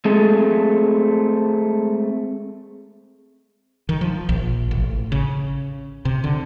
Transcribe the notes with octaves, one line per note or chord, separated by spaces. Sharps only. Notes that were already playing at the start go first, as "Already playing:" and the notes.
G#3 A3 C4 G#4 A4
D#3
F3
A#1
A1
C#3
C3
D3